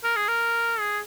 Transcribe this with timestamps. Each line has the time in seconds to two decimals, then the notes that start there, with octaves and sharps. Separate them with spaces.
0.04 A#4
0.16 G#4
0.28 A#4
0.79 G#4